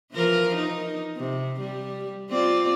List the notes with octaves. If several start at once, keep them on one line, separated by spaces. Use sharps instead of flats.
E3 F3 A#4
D#4
C3
G3
C4 F4 D5